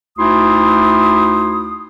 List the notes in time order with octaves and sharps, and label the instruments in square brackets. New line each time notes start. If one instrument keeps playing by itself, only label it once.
[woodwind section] D2 A3 D#4 E4 C6 D#6